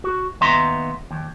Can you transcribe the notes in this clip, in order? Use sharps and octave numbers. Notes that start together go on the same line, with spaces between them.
F#4
D#2 B3 D#5 E5 A#5 C6
D#2